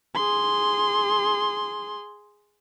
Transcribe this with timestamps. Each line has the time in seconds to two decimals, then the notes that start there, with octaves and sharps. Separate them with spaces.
0.15 G#4 C6